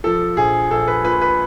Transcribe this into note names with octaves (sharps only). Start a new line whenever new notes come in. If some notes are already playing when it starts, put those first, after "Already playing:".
F3 A4
A#1 G#4
A#1 A4
B4
A#2 B4
B4